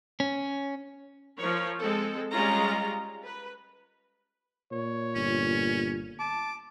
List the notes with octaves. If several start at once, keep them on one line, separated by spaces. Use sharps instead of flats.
C#4
F3 A#4 C#5
G#3 C4 A4
G3 G#3 C#4 F4 A#5
B4
A#2 C#5
G1 C#4
A5 D6